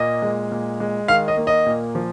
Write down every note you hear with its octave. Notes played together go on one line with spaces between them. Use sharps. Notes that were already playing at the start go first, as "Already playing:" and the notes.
Already playing: A#2 A#3 D#5
G#3
A#2
G#3
D#3 F5
D#5
A#3
D#5
A#2
F3